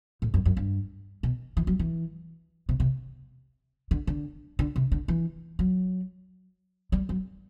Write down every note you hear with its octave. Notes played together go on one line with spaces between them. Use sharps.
A2
F#2
F#2
G2
B2
E3
F#3
E3
C3
C3
D3
D3
D3
C3
D3
E3
F#3
G3
F#3